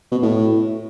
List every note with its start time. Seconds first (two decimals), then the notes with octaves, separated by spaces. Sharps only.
0.12 B2
0.23 A2